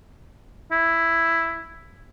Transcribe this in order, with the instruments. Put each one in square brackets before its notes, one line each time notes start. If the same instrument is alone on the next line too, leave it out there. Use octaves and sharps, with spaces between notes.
[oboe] E4